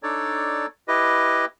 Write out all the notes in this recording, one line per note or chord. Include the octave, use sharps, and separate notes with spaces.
D4 D#4 A4 C#5 D5
E4 G4 B4 D#5